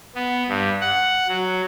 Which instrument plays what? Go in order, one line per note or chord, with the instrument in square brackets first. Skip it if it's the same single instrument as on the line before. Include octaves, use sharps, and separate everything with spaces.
[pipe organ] B3
G2
F#5
F#3